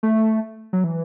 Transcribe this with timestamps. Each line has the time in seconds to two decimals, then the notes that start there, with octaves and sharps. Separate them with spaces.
0.03 A3
0.73 F#3
0.84 E3